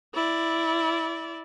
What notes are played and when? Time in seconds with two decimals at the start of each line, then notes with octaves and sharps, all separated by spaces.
0.14 E4 D5